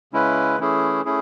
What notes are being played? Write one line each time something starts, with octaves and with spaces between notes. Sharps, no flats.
C#3 G#3 C#4 E4 B4
E3 A3 C#4 E4 G#4
A3 C#4 E4 G#4